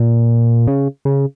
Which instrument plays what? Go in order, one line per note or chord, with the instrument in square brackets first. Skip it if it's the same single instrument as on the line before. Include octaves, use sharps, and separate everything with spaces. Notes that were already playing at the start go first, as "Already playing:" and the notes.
Already playing: [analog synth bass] A#2
C#3
C#3